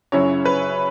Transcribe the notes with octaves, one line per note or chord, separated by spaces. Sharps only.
F#2 C#3 F#3 C#4 E4 C#5
B4